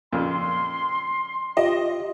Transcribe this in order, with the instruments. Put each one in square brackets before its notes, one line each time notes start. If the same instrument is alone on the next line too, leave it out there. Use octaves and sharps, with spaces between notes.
[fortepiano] F2 A#2 C#3 [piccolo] C6
[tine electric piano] F4 G4 [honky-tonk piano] D#5